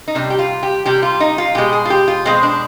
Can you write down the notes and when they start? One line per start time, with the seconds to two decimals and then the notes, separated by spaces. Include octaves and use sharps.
0.08 D#4
0.15 C3 G3 D4
0.30 G4
0.39 F4
0.63 G4
0.85 C3 G3 G4
1.03 F4
1.20 D#4
1.38 F4
1.55 B2 G#3 G4
1.73 G#4
1.85 F4
1.90 G4
2.08 F4
2.25 B2 G#3 C4
2.43 D4